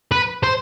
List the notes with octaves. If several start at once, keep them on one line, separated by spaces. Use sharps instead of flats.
B4
C5